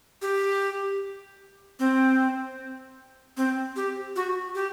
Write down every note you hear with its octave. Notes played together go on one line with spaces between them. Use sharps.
G4
C4
C4
G4
F#4
G4